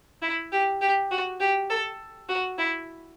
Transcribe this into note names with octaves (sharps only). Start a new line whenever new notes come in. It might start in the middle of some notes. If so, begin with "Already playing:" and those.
E4
G4
G4
F#4
G4
A4
F#4
E4